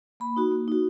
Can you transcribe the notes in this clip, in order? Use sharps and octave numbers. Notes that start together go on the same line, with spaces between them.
A#3 B5
D#4 F#4
A#3
D#4 F#4